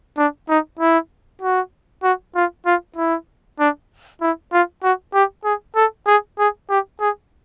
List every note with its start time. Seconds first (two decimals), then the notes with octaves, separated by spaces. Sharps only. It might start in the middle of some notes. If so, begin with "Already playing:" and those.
0.17 D4
0.49 D#4
0.79 E4
1.42 F#4
2.03 F#4
2.36 F4
2.66 F4
2.96 E4
3.59 D4
4.22 E4
4.52 F4
4.83 F#4
5.14 G4
5.45 G#4
5.76 A4
6.07 G#4
6.39 G#4
6.69 G4
7.00 G#4